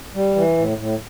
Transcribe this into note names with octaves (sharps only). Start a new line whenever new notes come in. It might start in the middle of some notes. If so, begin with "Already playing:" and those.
G3
E3
A2
A2